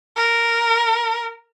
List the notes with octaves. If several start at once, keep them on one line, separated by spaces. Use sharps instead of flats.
A#4